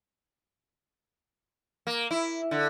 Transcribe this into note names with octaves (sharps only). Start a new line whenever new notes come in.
A#3
E4
D3